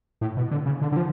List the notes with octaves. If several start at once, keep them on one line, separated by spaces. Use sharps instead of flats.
A2
B2
D3
C#3
D3
D3
F3